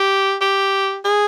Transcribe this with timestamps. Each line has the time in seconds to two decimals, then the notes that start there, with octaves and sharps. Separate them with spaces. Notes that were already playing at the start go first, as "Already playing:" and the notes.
Already playing: G4
0.41 G4
1.05 G#4